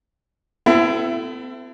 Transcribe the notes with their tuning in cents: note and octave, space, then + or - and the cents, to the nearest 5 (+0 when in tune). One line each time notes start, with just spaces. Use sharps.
C4 -40 E4 +25 A4 +5